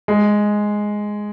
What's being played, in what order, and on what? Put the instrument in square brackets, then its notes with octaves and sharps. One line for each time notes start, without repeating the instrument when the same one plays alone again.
[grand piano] G#3